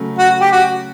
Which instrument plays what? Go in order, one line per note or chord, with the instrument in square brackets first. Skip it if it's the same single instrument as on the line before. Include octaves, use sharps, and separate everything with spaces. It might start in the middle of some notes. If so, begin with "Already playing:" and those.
Already playing: [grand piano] C#3 F#3 A3
[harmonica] F#4
G4
F#4